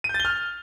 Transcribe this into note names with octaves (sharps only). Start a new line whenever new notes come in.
D#7
G6
A6
G7
F6